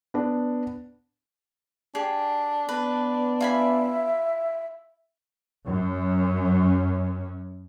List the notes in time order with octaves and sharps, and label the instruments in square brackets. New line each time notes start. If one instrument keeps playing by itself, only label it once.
[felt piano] B3 D4
[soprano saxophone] D4 [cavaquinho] G4 G#4
[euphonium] B3 [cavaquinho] B4
[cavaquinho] F4 G#5 B5 [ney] E5
[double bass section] F#2 C#4